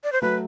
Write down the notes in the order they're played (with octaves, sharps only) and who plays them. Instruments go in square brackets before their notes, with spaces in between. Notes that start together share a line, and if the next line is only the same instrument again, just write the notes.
[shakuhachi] D5
C5
[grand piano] F#3 A3 [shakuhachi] B4